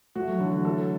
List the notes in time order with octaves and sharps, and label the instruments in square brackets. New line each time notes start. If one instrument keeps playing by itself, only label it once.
[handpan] A3 [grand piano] F#4
[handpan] F#3
[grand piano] D3 [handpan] E3
[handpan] F#3
[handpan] E3 [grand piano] A4